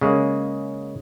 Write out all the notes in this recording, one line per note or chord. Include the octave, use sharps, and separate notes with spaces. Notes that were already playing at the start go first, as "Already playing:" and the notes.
C#3 G#3 A#3